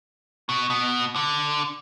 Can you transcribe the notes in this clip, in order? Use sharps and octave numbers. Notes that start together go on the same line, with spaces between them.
B2
B2
D3